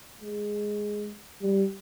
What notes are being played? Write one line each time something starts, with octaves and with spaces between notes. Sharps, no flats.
G#3
G3